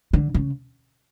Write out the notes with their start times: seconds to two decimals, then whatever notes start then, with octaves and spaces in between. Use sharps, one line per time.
0.13 D3
0.34 C#3